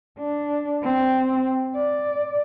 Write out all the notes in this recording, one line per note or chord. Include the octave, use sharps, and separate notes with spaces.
D4
C4
D5